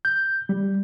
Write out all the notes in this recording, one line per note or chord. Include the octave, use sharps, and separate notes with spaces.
G6
G3